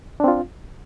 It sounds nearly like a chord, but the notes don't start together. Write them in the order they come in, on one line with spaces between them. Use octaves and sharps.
D4 C4 F4